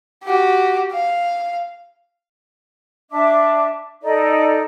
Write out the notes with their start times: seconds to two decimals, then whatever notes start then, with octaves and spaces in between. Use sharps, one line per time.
0.24 F#4 G4
0.92 F5
3.11 D4 E5 D6
4.02 D#4 A4 D5